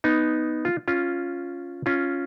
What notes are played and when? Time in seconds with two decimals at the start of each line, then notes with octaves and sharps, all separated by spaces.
0.04 B3 D#4
0.65 F4
0.88 C#4 F4
1.86 C#4 F4